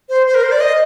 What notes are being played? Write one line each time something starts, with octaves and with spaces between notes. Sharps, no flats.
C5
C5
A#4
C5
D5
D#5